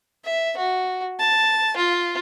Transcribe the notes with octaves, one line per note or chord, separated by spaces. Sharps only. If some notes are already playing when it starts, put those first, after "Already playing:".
E5
F#4
A5
F4